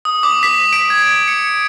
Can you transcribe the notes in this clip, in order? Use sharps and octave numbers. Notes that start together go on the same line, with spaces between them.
D#6
D6
B6
D7
G#6
C#7